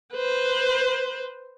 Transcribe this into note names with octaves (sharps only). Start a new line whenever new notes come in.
B4 C5